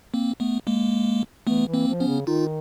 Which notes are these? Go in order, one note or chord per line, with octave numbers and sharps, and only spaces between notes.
A#3 C4
A3 B3
G#3 A#3
E3 A3 B3
E3
A#3 C4
F3
B3 C#4
C#3
D#3 D#4 F4